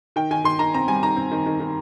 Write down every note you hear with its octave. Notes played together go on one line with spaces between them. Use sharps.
D#3 G5
D#3 G#5
D#3 C6
D#3 A#5
C4 A#5
G3 G#5
D#3 A#5
C4
D#3
D#3
D#3